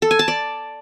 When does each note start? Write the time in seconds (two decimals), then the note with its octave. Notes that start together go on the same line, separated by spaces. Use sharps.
0.02 A4
0.11 G#5
0.19 A5
0.28 D5